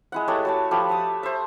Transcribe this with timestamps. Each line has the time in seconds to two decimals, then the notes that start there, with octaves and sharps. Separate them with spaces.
0.12 G#3 E4 F#5
0.28 A3 E4 G4 C#5
0.45 F#4 C#5 A5
0.71 F3 G4 A4 B5
0.89 E5 A5 D#6
1.23 C5 E5